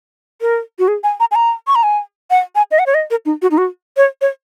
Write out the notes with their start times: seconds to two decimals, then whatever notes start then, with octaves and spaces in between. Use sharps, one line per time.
0.41 A#4
0.79 F#4
0.88 G#4
1.04 G#5
1.20 A#5
1.31 G#5
1.35 A#5
1.67 C#6
1.75 A#5
1.83 G#5
2.30 F#5
2.55 G#5
2.71 D#5
2.79 F#5
2.86 C#5
2.94 D#5
3.11 A#4
3.25 D#4
3.42 F#4
3.51 D#4
3.58 F#4
3.97 C#5
4.21 C#5